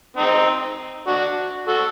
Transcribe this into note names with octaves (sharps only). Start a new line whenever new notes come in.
C4 D#4
D4 F#4
F#4 A4